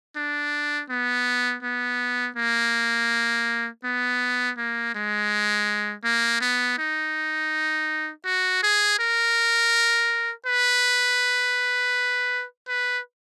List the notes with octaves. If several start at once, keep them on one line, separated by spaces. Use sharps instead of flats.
D4
B3
B3
A#3
B3
A#3
G#3
A#3
B3
D#4
F#4
G#4
A#4
B4
B4